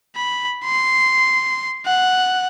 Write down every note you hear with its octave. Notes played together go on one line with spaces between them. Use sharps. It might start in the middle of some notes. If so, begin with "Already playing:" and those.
B5
C6
F#5